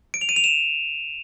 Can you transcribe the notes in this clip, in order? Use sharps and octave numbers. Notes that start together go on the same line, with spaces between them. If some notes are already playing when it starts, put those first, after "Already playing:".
D7
F7
D#7
F7
E7